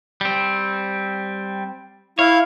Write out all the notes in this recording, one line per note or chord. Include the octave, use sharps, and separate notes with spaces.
G3 C4
E4 C#5 F5